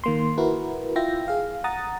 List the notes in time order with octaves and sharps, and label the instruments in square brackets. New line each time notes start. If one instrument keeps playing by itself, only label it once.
[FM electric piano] D#3 A#3 C6
E4 F#4 A#4 B4
E4 F4 E5 G5 A#6
G#4 F5
F#5 A#5 D#6 A6